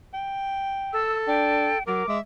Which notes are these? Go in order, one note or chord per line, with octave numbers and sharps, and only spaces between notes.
G5
A4 E6
D4 G5
F#3 A#4 D6
G#3 E5